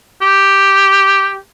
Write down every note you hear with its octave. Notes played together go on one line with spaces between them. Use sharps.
G4